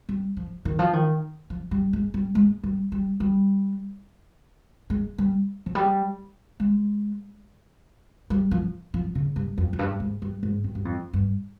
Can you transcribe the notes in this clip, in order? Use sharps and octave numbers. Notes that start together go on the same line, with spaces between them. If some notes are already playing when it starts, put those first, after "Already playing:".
G3
F3
D#3
F3
D#3
F3
G3
G#3
G3
G#3
G3
G3
G3
G#3
G3
F3
G3
G#3
G3
F3
F3
C#3
G2
F2
F2
G2
G#2
G2
G#2
G2
G2
F2
G2